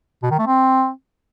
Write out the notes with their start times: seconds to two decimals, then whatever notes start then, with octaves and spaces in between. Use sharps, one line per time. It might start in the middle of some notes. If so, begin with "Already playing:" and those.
0.23 B2
0.31 D#3
0.38 A3
0.46 C4